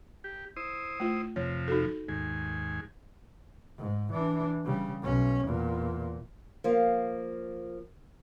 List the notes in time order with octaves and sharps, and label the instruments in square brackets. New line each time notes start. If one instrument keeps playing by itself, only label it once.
[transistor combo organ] G4
E4 C5 D#6
[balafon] A3 F4
[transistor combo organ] F2 C3 F3 [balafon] C#5
[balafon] D#4 F#4 A4
[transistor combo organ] D#2 G#2 G#5
[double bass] G#2
E3 D4
C#3 G3
B1 C#4
E2 A#2
[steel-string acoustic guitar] F3 A#3